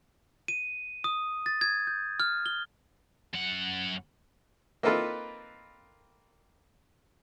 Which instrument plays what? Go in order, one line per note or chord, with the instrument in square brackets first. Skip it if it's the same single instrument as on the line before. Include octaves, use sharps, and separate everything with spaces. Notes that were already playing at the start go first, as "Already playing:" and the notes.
[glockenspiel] D#7
D#6
A6
G#6
G6
F6
G7
[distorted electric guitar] F#2 F#5
[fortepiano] A#3 C4 D#4 F4 A4 B4